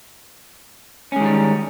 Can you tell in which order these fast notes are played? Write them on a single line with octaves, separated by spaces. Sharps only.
C#4 G#3 D#3 G3